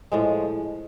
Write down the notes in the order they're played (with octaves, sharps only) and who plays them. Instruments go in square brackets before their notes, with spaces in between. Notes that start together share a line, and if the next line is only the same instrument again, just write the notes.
[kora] A2 F3 G#3